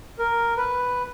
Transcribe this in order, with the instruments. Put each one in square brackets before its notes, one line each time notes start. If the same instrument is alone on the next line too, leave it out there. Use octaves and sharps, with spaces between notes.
[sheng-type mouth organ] A#4
B4